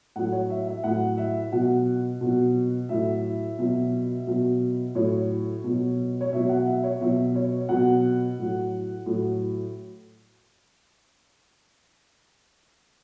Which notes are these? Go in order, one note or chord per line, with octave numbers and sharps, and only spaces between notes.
A2 F#3 F#5
C#5
E5
E5
A2 F#3 F#5
E5
B2 F#3 F#5
B2 F#3
A2 F#3 E5
B2 F#3
B2 F#3
A2 F#3 C#5
B2 F#3
C#5
B2 F#3 E5
F#5
E5
C#5
B2 F#3 E5
C#5
B2 F#3 F#5
A2 F#3
A2 F#3